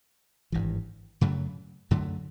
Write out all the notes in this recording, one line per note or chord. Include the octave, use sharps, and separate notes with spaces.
G#1 G2 E3
F#2 C#3 F#3 A3
F#2 D3 F#3 A3